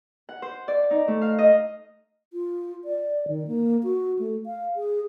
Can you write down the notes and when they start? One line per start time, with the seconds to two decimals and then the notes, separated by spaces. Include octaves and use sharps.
0.29 F#5
0.42 C5
0.68 D5
0.91 D#4
1.08 A3
1.21 F5
1.39 D#5
2.33 F4
2.85 D5
3.28 D#3
3.47 A#3
3.83 F#4
4.19 A3
4.46 F5
4.76 G#4